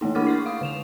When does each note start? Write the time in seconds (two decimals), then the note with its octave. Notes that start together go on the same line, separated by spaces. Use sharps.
0.01 E3 A3 A#3 D#4
0.15 D4 E4 F#5 D6 F6 A6
0.27 C6 C#6 C7
0.46 F5 C#6 D#6
0.61 D3 E7 F7